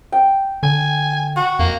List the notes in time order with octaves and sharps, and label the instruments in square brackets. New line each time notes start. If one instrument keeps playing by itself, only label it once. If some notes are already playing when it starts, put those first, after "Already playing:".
[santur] G5
[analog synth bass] D3 [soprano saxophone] G#5
[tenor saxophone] F#4
[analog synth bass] F2 [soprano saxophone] A#3